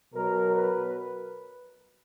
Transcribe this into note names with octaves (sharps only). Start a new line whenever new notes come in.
B2 F#3 A#4
B4